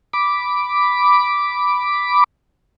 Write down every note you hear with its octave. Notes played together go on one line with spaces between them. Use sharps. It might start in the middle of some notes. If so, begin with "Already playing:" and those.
B5 D6